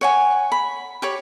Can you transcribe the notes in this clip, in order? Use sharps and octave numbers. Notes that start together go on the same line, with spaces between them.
C#5 F#5 G#5
B5
G4 C#5 B5